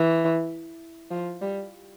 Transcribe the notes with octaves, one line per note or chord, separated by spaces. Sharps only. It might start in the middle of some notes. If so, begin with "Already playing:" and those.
Already playing: E3
F3
G3